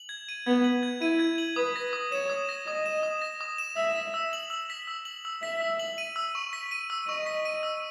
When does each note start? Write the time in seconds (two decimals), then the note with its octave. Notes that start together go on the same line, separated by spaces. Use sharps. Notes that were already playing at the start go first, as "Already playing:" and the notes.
Already playing: F#7
0.09 G#6
0.29 D#7
0.46 B3 G#6
0.64 F#7
0.83 G#6
1.01 E4 D#7
1.19 G#6
1.38 F#7
1.56 B4 D#6
1.76 A#6
1.93 D#6
2.12 C#5 E7
2.30 D#6
2.49 A#6
2.67 D#5 D#6
2.86 E7
3.03 D#6
3.22 A#6
3.41 D#6
3.58 E7
3.77 E5 E6
3.96 B6
4.14 E6
4.33 F#7
4.50 E6
4.70 B6
4.87 E6
5.05 F#7
5.25 E6
5.42 E5 B6
5.61 E6
5.80 F#7
5.98 D#7
6.16 E6
6.35 C#6
6.53 B6
6.71 D#7
6.90 E6
7.08 D#5 C#6
7.26 B6
7.45 D#7
7.63 E6